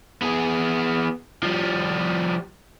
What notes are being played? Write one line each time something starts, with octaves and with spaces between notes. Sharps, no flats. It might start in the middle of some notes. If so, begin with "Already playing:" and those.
B3 G#4
F3 G3